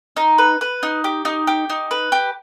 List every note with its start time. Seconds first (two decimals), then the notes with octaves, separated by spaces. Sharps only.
0.17 D#4
0.38 B4
0.61 B4
0.83 D#4
1.04 G4
1.25 D#4
1.47 G4
1.70 D#4
1.91 B4
2.12 G4